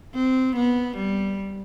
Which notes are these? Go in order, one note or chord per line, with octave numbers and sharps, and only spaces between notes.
C4
B3
G3